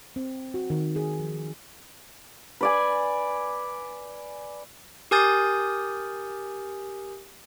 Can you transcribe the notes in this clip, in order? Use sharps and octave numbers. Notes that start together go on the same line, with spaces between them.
C4
F#4
D#3
G#4
F3
B4 D5 G#5
G4 A#4 G#5 D#6 G6 A6